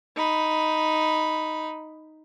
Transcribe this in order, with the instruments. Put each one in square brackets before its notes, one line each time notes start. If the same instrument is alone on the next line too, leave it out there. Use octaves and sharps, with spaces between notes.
[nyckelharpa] D#4 B5